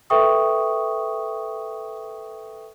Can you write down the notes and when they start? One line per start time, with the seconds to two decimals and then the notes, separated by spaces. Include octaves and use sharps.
0.10 A4 B4 E5 G5 C#6 D#6